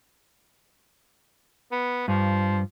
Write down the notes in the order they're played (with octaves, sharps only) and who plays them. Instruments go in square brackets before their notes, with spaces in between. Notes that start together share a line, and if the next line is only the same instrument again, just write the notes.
[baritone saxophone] B3
[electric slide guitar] G2 [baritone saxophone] F3